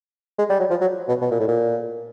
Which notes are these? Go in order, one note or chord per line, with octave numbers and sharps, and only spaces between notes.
G#3
G3
F#3
F3
F#3
B2
B2
A#2
A2
A#2